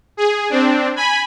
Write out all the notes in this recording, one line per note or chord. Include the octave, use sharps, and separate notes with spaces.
G#4
C4 D4
G#5 B5